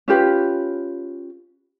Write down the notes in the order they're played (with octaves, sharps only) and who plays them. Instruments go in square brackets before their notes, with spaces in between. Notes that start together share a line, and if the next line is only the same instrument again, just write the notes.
[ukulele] C#4 F4 G4 B4